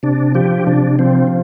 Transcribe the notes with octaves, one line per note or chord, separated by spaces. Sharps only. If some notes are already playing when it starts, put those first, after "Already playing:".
C3 D4
F3 G4
C3 D4
F3 C4